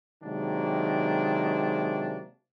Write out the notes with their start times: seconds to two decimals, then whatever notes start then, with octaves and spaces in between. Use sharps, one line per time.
0.23 C3 D#3 F#3 G#3 A#3 D4